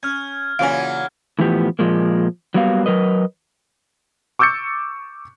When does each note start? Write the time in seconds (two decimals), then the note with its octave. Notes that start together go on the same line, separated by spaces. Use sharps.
0.03 C#4 F6 G#6
0.59 A#2 C#3 E3 F#3 C#4 F5 G#5
1.39 A2 E3 F3 B3 G4
1.79 A#2 F3 G#3 A#3
2.54 F#3 G3 A#3 B3 F#4 F5
2.86 F#3 A#4 B4 D#5
4.39 C#6 D6 E6 G6 A6 C#7